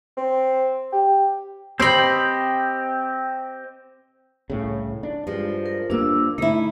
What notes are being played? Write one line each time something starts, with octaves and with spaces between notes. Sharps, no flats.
C4
G4
C4 G4 C5 D#5 B5
C2 A2 C#3
D4
G2 F3 G#3
A#4
G2 A#3 D4 D6 E6
D3 A3 D#4 E4